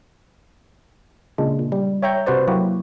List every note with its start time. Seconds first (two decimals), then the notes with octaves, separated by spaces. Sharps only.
1.38 A#2 C#3 G#3 D4
1.59 A#2
1.72 G3
2.02 C#5 E5 G5 A#5 C#6 G6
2.26 C3 F#4 B4 C5 D5
2.48 F#3 A#3 E4 F#4 G4